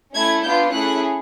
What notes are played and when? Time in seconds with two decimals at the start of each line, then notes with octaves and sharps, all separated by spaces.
0.15 A3 C#4 E4 G#6
0.44 B3 D4 F4 G6
0.72 A3 C#4 E4 G#4 F#6